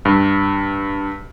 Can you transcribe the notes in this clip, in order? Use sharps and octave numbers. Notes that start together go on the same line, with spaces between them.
G2